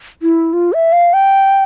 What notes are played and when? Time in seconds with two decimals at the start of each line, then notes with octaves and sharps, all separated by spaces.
0.22 E4
0.53 F4
0.73 E5
0.93 F5
1.14 G5